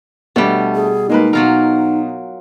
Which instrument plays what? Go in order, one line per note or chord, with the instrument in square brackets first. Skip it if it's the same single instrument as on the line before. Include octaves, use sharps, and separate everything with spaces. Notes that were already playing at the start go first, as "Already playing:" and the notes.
[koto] B2 G3 [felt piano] A3 D4
[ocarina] G#4
[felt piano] G#3 A#3 B4 [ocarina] D#4
[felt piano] B2 [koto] F#3 F4 A#4